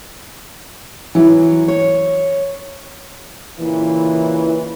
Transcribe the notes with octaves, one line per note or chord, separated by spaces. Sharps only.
E3 F#3
C#5
A#2 C#3 E3